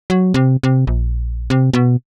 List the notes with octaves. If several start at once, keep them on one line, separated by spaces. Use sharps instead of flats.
F#3
C3
C3
A#1
C3
B2